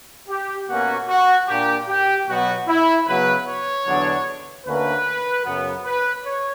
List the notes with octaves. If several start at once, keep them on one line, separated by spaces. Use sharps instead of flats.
G4
B2 A#3 C#4 F#4
F#4
A#2 A#3 D4 G4
G4
B2 F#3 B3 F#4
E4
C#3 F#3 B3 B4
C#5
E2 D3 F#3 B3 D4
D2 D3 A#3 C#4 B4
F#2 C#3 F#3 B3
B4
C#5